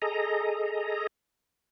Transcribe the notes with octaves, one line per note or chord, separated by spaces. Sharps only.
G#4 A4 D#5 A#5